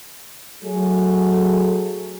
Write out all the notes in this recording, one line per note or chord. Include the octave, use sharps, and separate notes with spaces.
F#3 A3 G#4